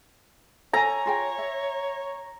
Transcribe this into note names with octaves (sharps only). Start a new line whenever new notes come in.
A4 C#5 G#5 A#5
F4 G#4 G5
E5